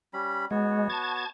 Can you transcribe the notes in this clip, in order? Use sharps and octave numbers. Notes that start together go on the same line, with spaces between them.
G3 C#4 B5
G#3 B3 F#4 C#5
A5 G#6